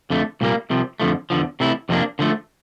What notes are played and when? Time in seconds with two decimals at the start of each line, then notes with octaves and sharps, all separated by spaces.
0.10 F2 D3 A3
0.41 C2 A#2 G3 A#3
0.70 C2 C3 F3
1.00 F2 D3 F3 A3
1.30 E2 D3 F3
1.60 C3 E3 A3 E4
1.89 F2 C3 F3 A#3 D4
2.19 D3 F3 A3